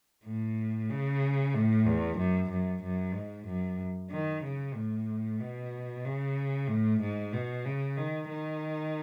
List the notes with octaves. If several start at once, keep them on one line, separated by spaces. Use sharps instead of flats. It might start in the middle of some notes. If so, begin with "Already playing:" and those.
A2
C#3
A2
E2
F#2
F#2
F#2
G#2
F#2
D#3
C#3
A2
B2
C#3
A2
G#2
B2
C#3
D#3
D#3